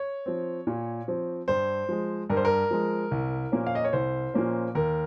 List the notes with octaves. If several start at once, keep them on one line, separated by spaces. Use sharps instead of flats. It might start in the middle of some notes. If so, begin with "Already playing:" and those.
Already playing: C#5
F3 C4
A#2
F3 C4
G2 C5
F3 G#3
G2 A#4
C5
A#4
F3 G#3
C2
A#2 F3 A#3 C#4
F5
D#5
C#5
C2 C5
A#2 F3 A#3 C#4
D#2 A#4